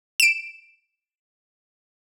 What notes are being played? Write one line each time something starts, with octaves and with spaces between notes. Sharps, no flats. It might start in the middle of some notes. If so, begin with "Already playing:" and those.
D7 E7